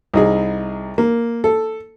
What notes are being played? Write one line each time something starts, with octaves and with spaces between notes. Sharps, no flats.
C2 D#4 G#4
A#3
A4